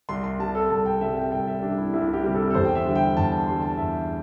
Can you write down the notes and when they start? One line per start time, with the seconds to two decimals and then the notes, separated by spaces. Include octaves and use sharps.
0.09 C2 C6
0.24 C6
0.40 C3 G3 A5
0.55 A4
0.70 C2 A5
0.86 G5
1.01 C3 G3 E5
1.17 G5
1.32 C2 G5
1.47 E5
1.62 C3 G3 D4
1.78 E4
1.93 C2 E4
2.08 E4
2.13 G4
2.24 C3 G3
2.34 A4
2.50 A4
2.55 E2 C5
2.65 G5
2.75 E5
2.85 D3 G3
2.95 G5
3.16 E2 A5
3.32 A5
3.47 D3 G3 C6
3.62 A5
3.77 E2 E5